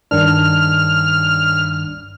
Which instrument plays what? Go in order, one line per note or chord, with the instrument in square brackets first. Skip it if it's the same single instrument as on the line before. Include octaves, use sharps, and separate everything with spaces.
[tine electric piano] G2 D#3 D4 [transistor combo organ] F6